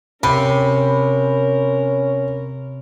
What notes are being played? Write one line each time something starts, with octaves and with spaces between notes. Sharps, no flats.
C3 C#4 A#4 B5